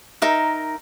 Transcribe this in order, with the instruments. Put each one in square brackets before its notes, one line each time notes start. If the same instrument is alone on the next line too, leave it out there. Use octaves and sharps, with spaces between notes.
[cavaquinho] D#4 A#4 E5